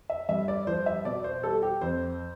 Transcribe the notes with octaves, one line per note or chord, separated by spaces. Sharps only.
E5
G2 E5
D5
F3 C5
E5
B2 D5
C5
G3 A4
G4
F2 C5